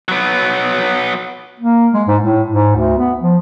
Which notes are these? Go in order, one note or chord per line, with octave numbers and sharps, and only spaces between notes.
F#3 B3
A#3
G#3
G#2
A2
G#2
D2
B3
F3